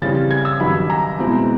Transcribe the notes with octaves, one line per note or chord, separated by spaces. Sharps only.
C#3 E3 G3 C4 A6
G#6
E6
G2 D#3 F#3 B5
A#5
B2 G#3 C4 E4